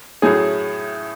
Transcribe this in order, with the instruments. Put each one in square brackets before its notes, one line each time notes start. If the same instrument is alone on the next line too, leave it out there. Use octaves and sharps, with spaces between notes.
[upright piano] A2 F#3 A3 C#4 [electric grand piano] G#4